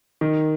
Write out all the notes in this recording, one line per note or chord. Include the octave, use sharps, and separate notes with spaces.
D#3